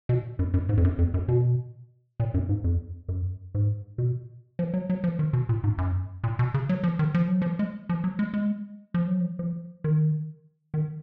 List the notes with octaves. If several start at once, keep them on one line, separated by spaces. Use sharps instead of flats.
B2
F#2
F#2
G#2
F2
F#2
F2
F#2
B2
A#2
F#2
G#2
F2
F#2
G#2
B2
F3
F#3
F#3
F3
D#3
B2
A#2
G#2
F#2
A#2
B2
C#3
F#3
F3
D#3
F3
F#3
F3
G#3
F3
F#3
G#3
G#3
F3
F#3
F3
F3
D#3
D#3